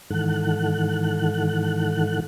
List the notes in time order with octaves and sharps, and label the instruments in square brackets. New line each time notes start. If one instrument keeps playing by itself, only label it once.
[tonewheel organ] G#2 D#3 E3 A4 F#5 F#6